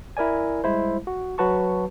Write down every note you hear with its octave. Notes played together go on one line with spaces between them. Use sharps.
E4 A#4 D5 G#5
G3 G#3 E4 C5
F#4
F#3 F#4 B4 A5 C#6